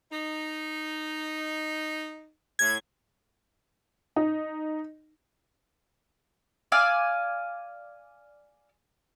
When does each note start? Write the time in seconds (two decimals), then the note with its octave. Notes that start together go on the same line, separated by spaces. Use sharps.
0.11 D#4
2.59 A2 G#6
4.16 D#4
6.72 D5 F5 G#5 E6